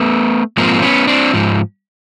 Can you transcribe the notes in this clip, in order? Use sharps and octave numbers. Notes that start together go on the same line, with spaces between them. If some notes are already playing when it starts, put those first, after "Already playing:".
Already playing: A3 B3
G#2 F3 A#3 C4
B3 C#4
C4 D4
G#2 F3